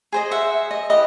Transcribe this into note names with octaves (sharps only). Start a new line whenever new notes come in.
G#4 C5 D#5
E5 F#5
D#5
E4 G4 B4 D#5